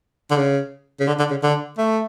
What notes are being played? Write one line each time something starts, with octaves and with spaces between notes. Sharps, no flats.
D3
C#3
C#3
D3
D3
C#3
D3
A3